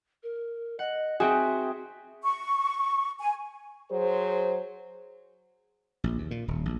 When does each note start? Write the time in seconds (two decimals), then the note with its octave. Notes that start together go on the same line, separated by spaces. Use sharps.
0.23 A#4
0.79 D#5 F#5
1.20 C4 F#4 G#4 E5 G5
2.23 C#6
3.20 G#5
3.91 F#3 G#4 C5
6.04 A#1
6.18 D#2
6.31 A#2
6.48 D#1
6.65 A#1